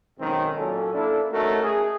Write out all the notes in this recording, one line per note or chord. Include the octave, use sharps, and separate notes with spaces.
B1 D#3 G#3 C4 C#4
A#2 F#3 C#4 A4
A#3 D4 E4 A4
A3 C#4 D#4 F#4 A4 A#4
G#4